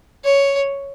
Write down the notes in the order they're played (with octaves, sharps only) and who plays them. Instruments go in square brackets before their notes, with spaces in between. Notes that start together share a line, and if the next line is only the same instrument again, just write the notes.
[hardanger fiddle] C#5